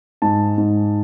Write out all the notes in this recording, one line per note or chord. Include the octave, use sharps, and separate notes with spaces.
G#2 A5
G#2